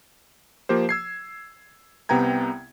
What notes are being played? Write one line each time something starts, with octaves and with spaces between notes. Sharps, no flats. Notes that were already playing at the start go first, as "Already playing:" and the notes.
F3 A#3 G4 C5
E6 G#6 C7
C2 C3 B3 G5 A#5 G#6